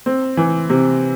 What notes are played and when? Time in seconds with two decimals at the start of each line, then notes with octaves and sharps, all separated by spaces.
0.06 C4
0.37 E3
0.70 C3